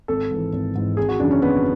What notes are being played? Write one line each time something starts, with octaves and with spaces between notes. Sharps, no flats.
G#1 A4
G#2 E3
G#1
G#2 E3
G#1 G#4
F#4
F#2 C#3 E3 D4
C#4
G#1 B3